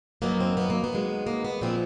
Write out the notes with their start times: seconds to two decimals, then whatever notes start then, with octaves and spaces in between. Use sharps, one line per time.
0.22 F#2 D#3 F#3 A#3 B3
0.40 C4
0.57 B3
0.70 A#3
0.84 B3
0.93 F#2 D#3 G#3
1.27 A#3
1.44 B3
1.61 A#2 F3 G#3 C4